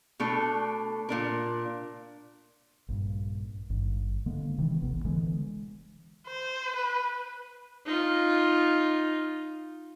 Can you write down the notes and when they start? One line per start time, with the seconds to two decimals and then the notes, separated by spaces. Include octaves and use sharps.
0.20 B2 A3 D4 A4
1.09 A#2 D4 A#4
2.88 A#1 G2
3.70 G#1 G2
4.26 D3 G#3 A#3 B3
4.58 C3 D#3 E3
4.81 D#1 A1 B3
5.05 D3 E3 G#3
6.27 C5
6.76 B4
7.86 D#4 F4